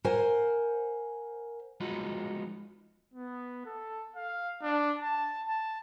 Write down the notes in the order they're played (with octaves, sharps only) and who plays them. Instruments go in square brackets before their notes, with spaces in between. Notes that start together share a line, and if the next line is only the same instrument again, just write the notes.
[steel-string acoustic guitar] A#4 C5 F#5 G#5
[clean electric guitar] F3 G#3 B3 D#4 F4 F#4
[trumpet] B3
A4
F5
D4
A5
A5